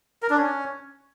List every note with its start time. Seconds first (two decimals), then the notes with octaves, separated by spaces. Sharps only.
0.23 A#4
0.30 D4
0.38 C#4